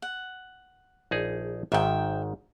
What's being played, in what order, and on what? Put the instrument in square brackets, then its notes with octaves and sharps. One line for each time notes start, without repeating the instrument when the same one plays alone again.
[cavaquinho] F#5
[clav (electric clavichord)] A#1 D#4 G#4
[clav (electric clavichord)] G#1 G#2 D#3 [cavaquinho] E5 G5